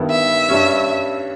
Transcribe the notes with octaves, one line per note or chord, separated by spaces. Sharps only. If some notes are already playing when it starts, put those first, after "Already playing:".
Already playing: G2 D#3 G3 B3 E4
E5
G2 G3 C#4